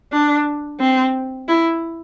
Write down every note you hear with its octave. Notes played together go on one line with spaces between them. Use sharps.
D4
C4
E4